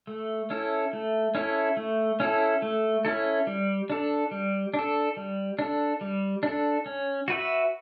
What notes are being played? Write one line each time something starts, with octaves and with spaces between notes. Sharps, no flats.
A3
C#4 E4 A4
A3
C#4 E4 A4
A3
C#4 E4 A4
A3
C#4 E4 A4
G3
D4 A4
G3
D4
A4
G3
D4 A4
G3
D4 A4
C#4
F#4 B4 E5